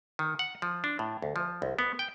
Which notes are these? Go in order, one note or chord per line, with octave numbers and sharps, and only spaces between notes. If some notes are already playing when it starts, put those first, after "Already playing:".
D#3
F#5
F3
D4
A2
D2
F3
C2
B3
G5